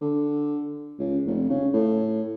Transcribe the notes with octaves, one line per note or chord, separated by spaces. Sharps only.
D3
C#2
F1
C#3
A2